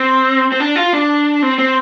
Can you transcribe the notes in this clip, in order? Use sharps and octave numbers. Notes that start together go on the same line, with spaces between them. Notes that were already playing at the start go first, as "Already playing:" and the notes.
Already playing: C4
C4
D4
F4
D4
C4
C4